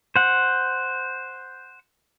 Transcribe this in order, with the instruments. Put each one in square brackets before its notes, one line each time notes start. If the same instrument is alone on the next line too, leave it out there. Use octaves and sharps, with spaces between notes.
[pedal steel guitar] C5 F#5